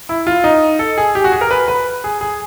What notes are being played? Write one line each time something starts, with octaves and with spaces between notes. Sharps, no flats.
E4
F4
D#4
A4
G#4
G4
F#4
G#4
A#4
B4
B4
G#4
G#4